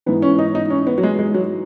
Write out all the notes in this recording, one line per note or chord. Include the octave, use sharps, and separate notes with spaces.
G#2 E3 B3
C#4
D#4
D#4
C#4
B3
F#3
G#3
G#3
F#3